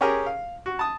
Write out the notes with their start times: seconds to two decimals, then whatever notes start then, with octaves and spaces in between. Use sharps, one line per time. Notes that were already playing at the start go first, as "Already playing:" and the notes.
0.01 C#4 G4 G#4 A#4
0.26 F5
0.66 F#4
0.79 A5 D#6